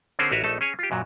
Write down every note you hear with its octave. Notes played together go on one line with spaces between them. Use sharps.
D3 C4 C#4 G#4 A#4 C5
A1 F#4 A#4 B4 C#5 E5
A#1 A3 D#4 A4 A5
C#4 G#4 C#5 G#5
F4 G4
F#2 A#2 F#3